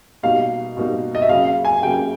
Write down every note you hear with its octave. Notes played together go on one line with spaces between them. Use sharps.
B2 G3 A#3 D#4 F5
B2 G3 A#3 D#4
D#5
E5
C#3 F#3 A#3 F5
F5
G#5
C#3 F#3 A#3 G5